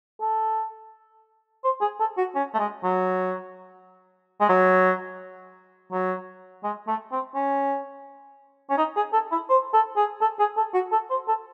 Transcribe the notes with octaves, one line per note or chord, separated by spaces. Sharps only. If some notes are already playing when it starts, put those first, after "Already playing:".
A4
C5
G#4
A4
F#4
C#4
A3
G#3
F#3
G#3
F#3
F#3
G#3
A3
C4
C#4
C#4
D#4
G#4
A4
E4
C5
A4
G#4
A4
G#4
A4
F#4
A4
C5
A4